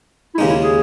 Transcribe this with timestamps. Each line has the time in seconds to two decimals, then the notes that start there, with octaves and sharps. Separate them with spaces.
0.34 E4
0.38 D#2 C#3 G#3 D#4
0.50 E4
0.62 G#4